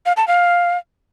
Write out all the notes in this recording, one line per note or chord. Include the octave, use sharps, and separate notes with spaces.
F5
A5
F5